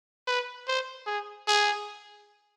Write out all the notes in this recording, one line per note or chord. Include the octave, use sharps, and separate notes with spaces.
B4
C5
G#4
G#4